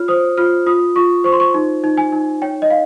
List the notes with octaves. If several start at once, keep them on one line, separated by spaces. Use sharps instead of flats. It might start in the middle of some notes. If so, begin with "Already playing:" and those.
Already playing: F4 C#5 F6
C5 D#6
F4 F6
F4 D#6
F4 C#6
C5 C#6
C6
C#6
D#4
D#4
G#5
D#4
C#5 G5
D#5
F5